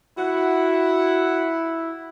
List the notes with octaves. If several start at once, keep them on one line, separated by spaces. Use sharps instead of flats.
E4 F#4 F#5